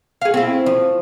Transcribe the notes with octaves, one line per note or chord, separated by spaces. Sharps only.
G#4 F5
C4 E4
F3